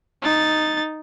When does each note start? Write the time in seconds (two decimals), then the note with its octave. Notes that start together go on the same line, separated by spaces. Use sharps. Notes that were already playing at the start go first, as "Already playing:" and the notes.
0.22 D#4 A6